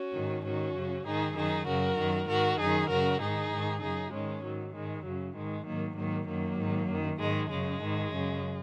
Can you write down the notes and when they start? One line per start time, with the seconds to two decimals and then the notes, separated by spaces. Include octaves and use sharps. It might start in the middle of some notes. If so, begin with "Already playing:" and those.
Already playing: C#4 F#4
0.14 G#2 D#3
0.44 G#2 D#3 C#4 F#4
0.75 F#2 C#3
1.06 G#2 D#3 D#4 G#4
1.36 F#2 D#3 D#4 G#4
1.67 F#2 C#3 F#4 A#4
1.98 F#2 D#3
2.28 G#2 D#3 F#4 A#4
2.59 F#2 D#3 D#4 G#4
2.89 F#2 C#3 F#4 A#4
3.21 G#2 D#3 D#4 G#4
3.51 G#2 D#3
3.82 F#2 C#3 D#4 G#4
4.13 G#2 D#3 G#3 C#4
4.44 G#2 D#3 F#3
4.74 G#2 D#3 G#3
5.05 F#2 C#3 F#3
5.36 G#2 D#3 G#3
5.66 G#2 D#3 F#3 A#3
5.97 G#2 D#3 F#3 A#3
6.28 F#2 D#3 F#3 A#3
6.58 G#2 D#3
6.89 F#2 D#3
7.19 G#2 D#3 G#3
7.50 F#2 C#3 G#3
7.82 G#2 D#3
8.11 F#2 C#3